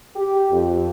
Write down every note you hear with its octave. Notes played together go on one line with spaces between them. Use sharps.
G4
F2